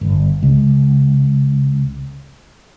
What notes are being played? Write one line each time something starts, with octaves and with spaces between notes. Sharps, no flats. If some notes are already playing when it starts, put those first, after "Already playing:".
G1
C#2